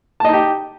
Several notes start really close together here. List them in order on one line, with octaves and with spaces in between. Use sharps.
A5 D#5 D#4 G4